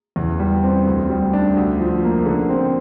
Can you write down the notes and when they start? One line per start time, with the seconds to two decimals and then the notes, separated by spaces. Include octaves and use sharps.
0.16 E2
0.39 G3
0.63 C4
0.86 D2
1.10 G3
1.33 D4
1.56 D2
1.80 F3
2.03 A#3
2.26 D3
2.49 C4